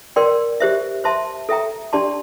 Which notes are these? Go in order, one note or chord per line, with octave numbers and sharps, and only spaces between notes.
A#4 D5 G5 C6
G4 C5 E5
C5 E5 A5 C6
A4 E5 G5 A#5
D4 G4 D5 A5 C6